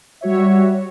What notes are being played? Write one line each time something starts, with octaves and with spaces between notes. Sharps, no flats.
G3 F#4 C#5 E5